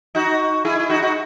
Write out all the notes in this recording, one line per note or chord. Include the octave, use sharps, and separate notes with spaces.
D#4 F#4
E4 G#4
E4
D#4 F#4
D#4 F#4